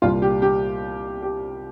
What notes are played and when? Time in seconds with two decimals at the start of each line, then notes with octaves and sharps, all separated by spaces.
0.02 C2 A#2 G3 F4
0.22 G4
0.42 G4
1.22 G4